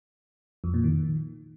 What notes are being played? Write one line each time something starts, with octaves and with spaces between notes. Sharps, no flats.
F2
A#2
D#3